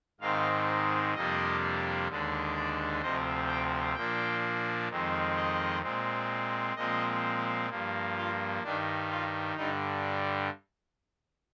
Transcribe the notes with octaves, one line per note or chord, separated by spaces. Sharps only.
G#2 D#3 G#3 C4 F5
F2 C3 G3 A#3 D4 D#5
D#2 D3 G#3 D4
D5
D2 C3 F3 C4 D#5
G5
A#2 F3 A#3 D4 G5
F2 D#3 G#3 C4
D#5
A#2 G#3 C4
A#2 F3 G#3 C4 D#5
G2 F3 A#3
F4
G2 D#3 G3 D4
F4
G2 D3 G3 D#4